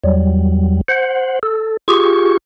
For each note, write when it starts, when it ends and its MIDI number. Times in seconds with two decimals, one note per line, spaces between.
0.04 0.81 40
0.04 0.81 54
0.04 0.81 55
0.88 1.39 72
0.88 1.39 78
1.43 1.77 69
1.88 2.37 65
1.88 2.37 67
1.88 2.37 68
1.88 2.37 85